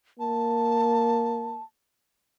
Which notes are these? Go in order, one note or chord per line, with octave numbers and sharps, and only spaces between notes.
A#3 A5